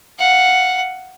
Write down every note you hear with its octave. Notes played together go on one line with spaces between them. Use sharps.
F5 F#5